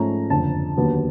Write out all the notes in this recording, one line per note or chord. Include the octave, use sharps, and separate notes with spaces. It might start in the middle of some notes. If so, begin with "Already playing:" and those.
Already playing: G#2 F3 A3 C#4 A#5
F#1 F2 D3 A5
D#2 D3 F#3 B3